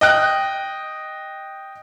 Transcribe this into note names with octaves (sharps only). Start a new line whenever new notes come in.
D#5 G5 F#6